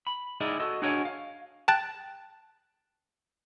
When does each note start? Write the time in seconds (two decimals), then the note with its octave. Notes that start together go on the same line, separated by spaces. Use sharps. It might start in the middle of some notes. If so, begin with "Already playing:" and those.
0.07 B5
0.41 D#4 E4 G#4 A#4 D5 D#5
0.60 F#4 A4 D#5
0.82 D4 F#4 G#4 A#4 C#5 D#5
1.05 F5
1.68 G5 A5 F#6 A6